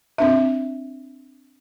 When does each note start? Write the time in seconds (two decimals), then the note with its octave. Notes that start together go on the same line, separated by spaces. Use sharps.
0.18 C4 D4 E5